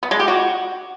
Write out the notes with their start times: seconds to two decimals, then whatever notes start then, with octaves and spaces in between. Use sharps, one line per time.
0.03 B3
0.11 G#3
0.19 G4
0.28 F#4